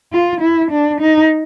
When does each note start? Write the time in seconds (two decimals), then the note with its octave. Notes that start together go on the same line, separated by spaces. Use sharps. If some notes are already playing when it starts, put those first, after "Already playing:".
0.13 F4
0.41 E4
0.71 D4
1.00 D#4